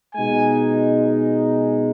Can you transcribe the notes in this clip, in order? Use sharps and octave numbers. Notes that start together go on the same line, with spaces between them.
B2 G#3 D#4 G#5